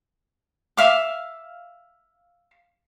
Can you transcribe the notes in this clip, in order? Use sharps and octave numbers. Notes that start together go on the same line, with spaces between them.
E5 F5 D6